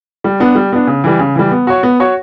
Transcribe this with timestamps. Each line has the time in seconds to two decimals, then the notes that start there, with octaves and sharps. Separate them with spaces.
0.24 G3
0.40 B3 D4
0.55 G3
0.72 B3 D4
0.87 C#3
1.04 E3 G3
1.19 C#3
1.35 E3 G3
1.51 B3
1.67 F#4 C#5
1.83 B3
2.00 F#4 C#5